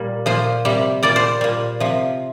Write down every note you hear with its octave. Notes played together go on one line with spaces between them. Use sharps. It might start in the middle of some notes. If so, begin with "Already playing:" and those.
Already playing: A#2 G3
A#2 F3 C5
C3 G3
A#2 G3 D5
C5
A#2 G3
C3 F3